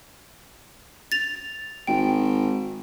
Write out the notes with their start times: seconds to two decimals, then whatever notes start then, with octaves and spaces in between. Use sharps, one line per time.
1.12 A6 F7
1.87 G#1 G5